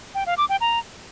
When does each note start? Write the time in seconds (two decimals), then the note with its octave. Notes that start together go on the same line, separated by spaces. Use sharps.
0.15 G5
0.26 F5
0.38 D6
0.49 G5
0.61 A#5